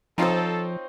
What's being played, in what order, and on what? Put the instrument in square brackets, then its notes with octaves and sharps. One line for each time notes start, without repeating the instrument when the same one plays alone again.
[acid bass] F3 [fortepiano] C4 D#4 F4 [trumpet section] A4 [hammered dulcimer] C5 C#5 C#6